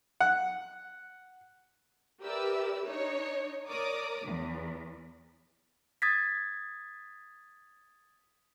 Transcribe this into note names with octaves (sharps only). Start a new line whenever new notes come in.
F#5
G4 A#4 B4 D5 E5 E6
D4 D#4 C#5
A#4 C#5 D5 D6 D#6
E2 E3
D#6 G#6 A6 B6